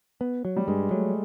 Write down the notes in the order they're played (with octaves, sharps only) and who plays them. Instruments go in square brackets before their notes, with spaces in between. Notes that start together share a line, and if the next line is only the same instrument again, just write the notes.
[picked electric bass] B3
F#3
[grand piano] G3
[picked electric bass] G2 [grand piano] G#3
[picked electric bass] F#3 [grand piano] A3